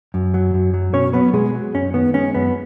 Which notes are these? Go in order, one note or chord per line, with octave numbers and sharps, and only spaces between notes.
F#2
F#3
F#2
F#3
B2 C#4 C#5
F#3 B3 B4
B2 G#3 G#4
F#3
F#2 C#4
D#3 B3
G#3 C#4
F#2 B3